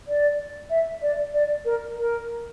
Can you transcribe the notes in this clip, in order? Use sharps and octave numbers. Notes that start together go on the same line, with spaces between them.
D5
E5
D5
D5
A#4
A#4